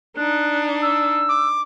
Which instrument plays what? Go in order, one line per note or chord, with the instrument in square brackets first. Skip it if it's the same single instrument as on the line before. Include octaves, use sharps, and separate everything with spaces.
[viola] D4 D#4 [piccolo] F#6
[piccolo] E6
[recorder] D6